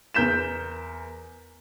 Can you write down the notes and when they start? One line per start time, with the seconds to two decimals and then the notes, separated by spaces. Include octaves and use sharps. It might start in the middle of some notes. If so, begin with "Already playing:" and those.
0.14 E2 A#4 G6 B6 E7